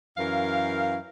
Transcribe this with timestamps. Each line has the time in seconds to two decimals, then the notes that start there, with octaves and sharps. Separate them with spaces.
0.18 F#2 E3 A#4 F5